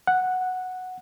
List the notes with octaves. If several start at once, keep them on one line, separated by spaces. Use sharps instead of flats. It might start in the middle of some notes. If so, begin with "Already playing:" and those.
F#5